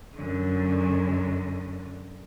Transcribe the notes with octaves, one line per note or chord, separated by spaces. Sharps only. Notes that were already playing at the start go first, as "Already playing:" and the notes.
F#2 D3